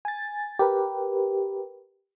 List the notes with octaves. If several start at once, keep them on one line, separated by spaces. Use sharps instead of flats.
G#5 A6
G4 A#4 B4